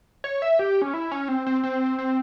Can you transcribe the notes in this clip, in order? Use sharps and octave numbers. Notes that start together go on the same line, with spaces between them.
C#5
E5
G4
C#4
E4
C#4
C4
C4
C4
C4